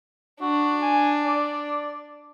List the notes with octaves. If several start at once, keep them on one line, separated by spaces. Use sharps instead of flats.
D4 F#4
G#5
D5